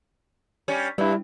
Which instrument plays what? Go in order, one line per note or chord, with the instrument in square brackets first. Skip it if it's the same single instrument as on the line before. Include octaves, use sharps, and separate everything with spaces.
[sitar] G3 C#4
[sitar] G2 [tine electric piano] G3 E4